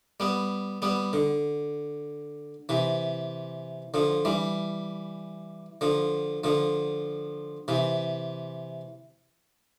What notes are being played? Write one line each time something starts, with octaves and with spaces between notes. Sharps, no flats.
G3 B3
G3 B3
D3
C3 E3
D3 F3
E3 G3
D3 F3
D3 F3
C3 E3